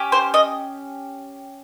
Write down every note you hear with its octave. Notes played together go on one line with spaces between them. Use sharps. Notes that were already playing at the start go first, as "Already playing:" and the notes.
Already playing: C#4 G4
C5
D#5